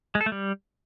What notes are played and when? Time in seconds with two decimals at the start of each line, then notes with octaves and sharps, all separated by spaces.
0.15 G#3
0.21 A4
0.26 A3
0.32 G3